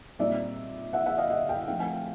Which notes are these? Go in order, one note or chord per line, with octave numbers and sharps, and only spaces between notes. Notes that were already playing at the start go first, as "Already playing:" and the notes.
A#2 G3 C4 D#4 D5 E5
E5 F#5
E5 F#5
D#5 F5
E5 F#5
F5 G5
F3 A3 C4 D#4 F5 G5
F#5 G#5